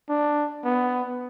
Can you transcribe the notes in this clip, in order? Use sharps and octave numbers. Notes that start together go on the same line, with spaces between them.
D4
B3